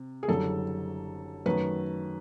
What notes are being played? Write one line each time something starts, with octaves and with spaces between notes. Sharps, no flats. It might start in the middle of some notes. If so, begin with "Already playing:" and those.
Already playing: C3
G#4
F#1 F#2 D3 G3 A4
F#2 D#3 F#3 A3 B4